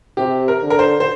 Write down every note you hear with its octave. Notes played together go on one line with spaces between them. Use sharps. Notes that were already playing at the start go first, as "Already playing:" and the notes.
C3 G4
A#4
D3
A#4
C5
C5